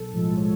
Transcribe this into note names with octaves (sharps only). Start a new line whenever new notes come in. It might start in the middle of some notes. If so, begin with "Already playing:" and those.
Already playing: B1 A4
A2 F3 G#3
C#5